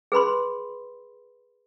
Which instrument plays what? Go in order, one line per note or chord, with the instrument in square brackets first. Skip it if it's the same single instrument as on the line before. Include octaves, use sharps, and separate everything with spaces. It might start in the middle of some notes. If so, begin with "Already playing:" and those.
[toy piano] G#4 B4 B5 C6